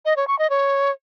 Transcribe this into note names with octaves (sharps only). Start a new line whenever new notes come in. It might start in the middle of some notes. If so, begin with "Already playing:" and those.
D#5
C#5
C#6
D#5
C#5